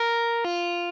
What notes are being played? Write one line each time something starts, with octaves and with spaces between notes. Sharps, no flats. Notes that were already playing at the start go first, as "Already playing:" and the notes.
Already playing: A#4
F4